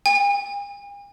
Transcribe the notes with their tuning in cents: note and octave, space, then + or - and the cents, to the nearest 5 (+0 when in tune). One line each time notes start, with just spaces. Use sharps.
G#5 -45